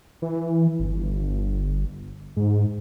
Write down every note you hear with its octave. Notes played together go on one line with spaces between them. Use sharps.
E3
G1
G#2